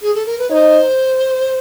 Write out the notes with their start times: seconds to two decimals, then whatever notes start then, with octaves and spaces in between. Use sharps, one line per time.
0.02 G#4
0.15 A4
0.26 A#4
0.38 B4
0.50 D#4 C5 C#5